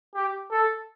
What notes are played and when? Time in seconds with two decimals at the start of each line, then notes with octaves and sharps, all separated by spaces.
0.15 G4
0.51 A4